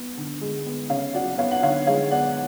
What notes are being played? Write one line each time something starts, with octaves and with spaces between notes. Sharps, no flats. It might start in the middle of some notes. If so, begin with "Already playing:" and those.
Already playing: B3
D3
G#3
B3
C#3 C#5 F5
F#3 D5 F#5
B3 C#5 F5
F#5
D3 C#5 F5
G#3 C#5 F5
B3 D5 F#5